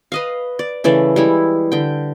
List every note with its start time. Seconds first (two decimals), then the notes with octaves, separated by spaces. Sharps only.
0.12 B4 D#5 F5
0.59 D5
0.84 C#3 E3 A3 D5
1.16 G3 G#3 E4
1.72 D3 G5